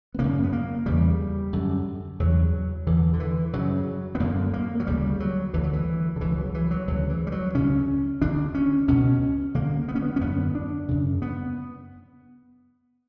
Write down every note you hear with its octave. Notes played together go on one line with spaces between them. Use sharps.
B3
F#2 C#3 A#3
B3
A#3
E2 C#3 G3
F#2 D3
E2 C#3 F#3
E2 D3 E3
D3
E3
F#2 C#3 F#3
B3
F#2 D3 A#3
A#3
F#3
D2 C#3 G3
F#3
D2 D3 E3
F#3
E3
D3
C#2 C#3 E3
F#3
E3
F#3
D2 C#3 F#3
E3
G3
F#3
C#2 C#3 C#4
D2 D3 D4
C#4
C#2 B2 C#4
D2 D3 A#3
B3
C#4
B3
C#4
F#2 D3 B3
D4
F#2 C#3
B3